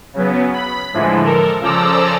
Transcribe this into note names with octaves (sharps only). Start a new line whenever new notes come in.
C#3 F#3 B3
B5
A2 D3 E3 F3 G#3
A4 A#4
C#3 F3 A4 D5 A#5 E6